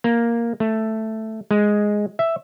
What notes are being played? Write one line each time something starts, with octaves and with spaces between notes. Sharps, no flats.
A#3
A3
G#3
E5